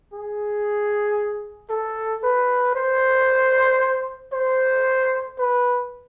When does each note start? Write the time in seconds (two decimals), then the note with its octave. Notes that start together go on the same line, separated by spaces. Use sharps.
0.13 G#4
1.70 A4
2.23 B4
2.76 C5
4.33 C5
5.39 B4